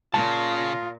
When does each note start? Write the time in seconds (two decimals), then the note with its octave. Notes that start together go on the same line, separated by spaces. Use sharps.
0.14 A#2 C#3 F4 A5